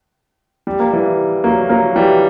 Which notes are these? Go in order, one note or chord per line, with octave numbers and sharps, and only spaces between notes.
G3
A#3
E3 G3
F#3 A#3
F#3 A#3
E3 G3